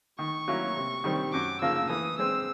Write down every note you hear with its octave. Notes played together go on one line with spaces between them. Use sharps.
D#3 C#6
F#3 A#3 C#4 E4
C3
D#3 G3 C4
F#2 D6
C#3 F3 A#3 E6
E3 D#6
G#3 C4 E6